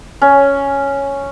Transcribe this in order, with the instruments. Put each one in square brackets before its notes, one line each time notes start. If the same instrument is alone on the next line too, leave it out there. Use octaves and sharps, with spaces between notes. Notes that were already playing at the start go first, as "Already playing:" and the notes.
[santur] C#4